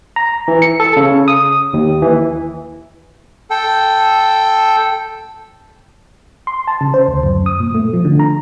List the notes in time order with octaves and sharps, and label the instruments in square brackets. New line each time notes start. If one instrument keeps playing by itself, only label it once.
[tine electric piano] A#5
E3
C#7
A4
C#3
D#6
D#2
E3
[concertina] A4 G5
[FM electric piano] C6
A5
C#3
C5
D2
F#2
D#6
A#2
A3
F3
D3
A#5